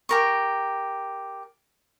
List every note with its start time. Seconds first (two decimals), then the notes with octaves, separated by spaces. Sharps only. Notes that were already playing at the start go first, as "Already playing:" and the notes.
0.09 G4 A#4 C#6